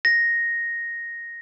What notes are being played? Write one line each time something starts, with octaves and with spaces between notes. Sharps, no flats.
A#6